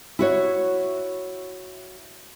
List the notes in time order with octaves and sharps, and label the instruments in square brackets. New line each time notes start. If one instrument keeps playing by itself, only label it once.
[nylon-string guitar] E4 F#4 C#5